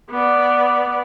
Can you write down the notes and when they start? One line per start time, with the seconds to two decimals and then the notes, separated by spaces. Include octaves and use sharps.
0.10 B3 D5